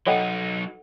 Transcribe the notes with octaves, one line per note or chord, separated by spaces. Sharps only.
F#3 D#4 A4 C#5 D#5 F#5 G5 B5